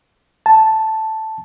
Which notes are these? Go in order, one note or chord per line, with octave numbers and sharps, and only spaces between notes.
A5